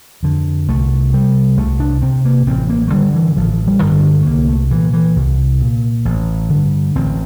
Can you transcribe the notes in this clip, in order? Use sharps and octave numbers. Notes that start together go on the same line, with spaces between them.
F2 D3
C2 A3
C3 G3
C2 A3
D4
C3 C4
A#3
A1 C4
A#3
A3
G2 D3 G3
E3
A1 F3
G3
G2 D3
A#3
A3
A3
C2 A#3
A3
A#2 E3
E3
C2
A#2
A1
G2 D3
A1 C4